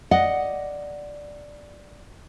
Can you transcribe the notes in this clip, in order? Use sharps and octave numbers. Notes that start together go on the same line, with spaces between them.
D5 D#5 F#5